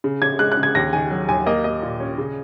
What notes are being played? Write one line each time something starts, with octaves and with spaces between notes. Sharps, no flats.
C#3
C#3 G#6
G#3 F#6
F#6
C#3
G#6
D#2 A#6
D#3 G#5
F#3
D#2 G#5
A#3 D#5
A#3 D#5
A#2
C#4
C#3